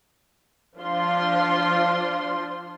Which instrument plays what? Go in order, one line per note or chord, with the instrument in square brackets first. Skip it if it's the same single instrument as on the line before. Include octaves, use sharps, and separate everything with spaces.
[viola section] F3 D4 F4 C6